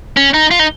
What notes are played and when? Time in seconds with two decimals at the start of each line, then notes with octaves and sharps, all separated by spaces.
0.17 C#4
0.34 D#4
0.51 F4
0.59 D#4